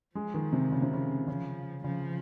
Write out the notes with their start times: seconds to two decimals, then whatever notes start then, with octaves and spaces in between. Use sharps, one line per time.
0.15 F3 G#3
0.34 D#3
0.53 C3
0.72 C#3
0.82 C3
0.93 C#3
1.28 C#3 F3
1.84 C#3 F3